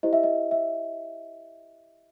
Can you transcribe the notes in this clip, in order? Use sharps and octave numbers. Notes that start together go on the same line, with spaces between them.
E4 G4 C5 D#5
E5
D#5
E5